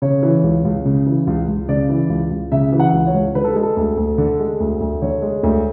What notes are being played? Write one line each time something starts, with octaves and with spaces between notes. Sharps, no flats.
C#3 C#5
E3
C#2
C#2
C#3
E3
C#2
C#2
C#3 D5
E3
C#2
C#2
C#3 E5
E3
F#5
C#2
C#5
C#2
D3 B4
A4
G#3 G#4
A4
D2
D2
D3
G#3
D2
D2
D3 C#5
G#3
D2